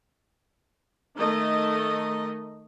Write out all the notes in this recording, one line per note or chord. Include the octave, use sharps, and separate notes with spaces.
D#3 A3 D#5